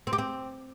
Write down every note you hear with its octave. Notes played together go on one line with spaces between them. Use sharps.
C4
G4
C4